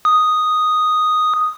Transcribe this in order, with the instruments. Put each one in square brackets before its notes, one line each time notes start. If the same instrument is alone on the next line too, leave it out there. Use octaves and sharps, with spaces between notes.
[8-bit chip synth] D#6